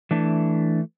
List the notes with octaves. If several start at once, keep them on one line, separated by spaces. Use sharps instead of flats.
E3 A3 D4